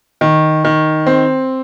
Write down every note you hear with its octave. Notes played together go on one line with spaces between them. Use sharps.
D#3
D#3
C4